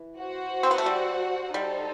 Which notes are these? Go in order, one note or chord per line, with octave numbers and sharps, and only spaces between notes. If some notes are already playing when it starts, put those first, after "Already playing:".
Already playing: E3
F#4 C5 F#5
C4
B3
A3
G3
G3 D#4 A4 C5